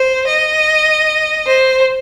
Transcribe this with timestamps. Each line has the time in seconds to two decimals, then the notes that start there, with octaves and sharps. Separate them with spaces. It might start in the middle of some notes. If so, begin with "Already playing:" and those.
Already playing: C5
0.27 D#5
1.46 C5